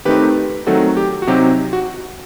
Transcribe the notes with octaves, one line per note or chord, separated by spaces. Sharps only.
D#3 A3 C4 D#4 G4 B4
D#3 F#3 A3 C4 D#4 F#4 A4
G4
F#4
C3 F#3 C4 D#4 G4
F#4